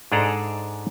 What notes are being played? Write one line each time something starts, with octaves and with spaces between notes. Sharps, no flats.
G#2 D4 G#4 A4 D5 A#5